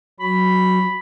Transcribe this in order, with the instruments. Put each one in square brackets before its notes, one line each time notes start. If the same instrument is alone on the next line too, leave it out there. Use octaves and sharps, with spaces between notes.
[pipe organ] F#3 F#4 [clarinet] B5